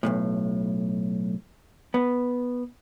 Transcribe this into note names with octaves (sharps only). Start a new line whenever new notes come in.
B1 F#2 A2
B3